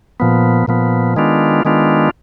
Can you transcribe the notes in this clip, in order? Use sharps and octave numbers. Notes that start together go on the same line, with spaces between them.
A#2 F3 B3
A#2 F3 B3
D#3 G#3 B3 D4 F4
D#3 G#3 B3 D4 F4